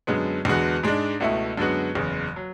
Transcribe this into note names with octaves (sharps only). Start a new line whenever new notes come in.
F#2 D3 G#3 B3
E2 D3 G#3 B3 F#4
G#2 G#3 D4
C#2 B2 A3 E4
F#2 D3 G#3 B3 F#4
F#1 E2 C#3
F#3